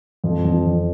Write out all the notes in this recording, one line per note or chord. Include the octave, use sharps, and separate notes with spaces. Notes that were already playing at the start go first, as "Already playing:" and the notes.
F2
F2
F2